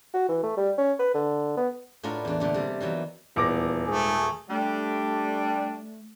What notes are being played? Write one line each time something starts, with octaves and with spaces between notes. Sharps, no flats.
F#4
E3
A3
G3
C#4
B4
D3
B3
A2 D4 F4 A#4 B4 F#5
E2 D4
A#2 D3 A3
C3 G3
D#3 E3 F#3 B3
D#1 E2 D6 A#6
G#2 A3 G#4
G3 A3 D4